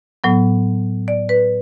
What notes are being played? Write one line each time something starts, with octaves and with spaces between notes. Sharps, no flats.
A2 F#3 B3
D5
B4